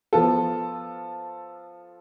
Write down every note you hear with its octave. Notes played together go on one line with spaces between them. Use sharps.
F3 B3 F4 A4